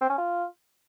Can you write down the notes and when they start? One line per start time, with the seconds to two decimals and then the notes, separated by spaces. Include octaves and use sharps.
0.01 C4
0.09 C#4
0.18 F4